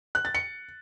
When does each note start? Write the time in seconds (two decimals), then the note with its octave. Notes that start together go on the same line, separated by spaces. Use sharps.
0.15 F#6
0.25 A6
0.35 C#7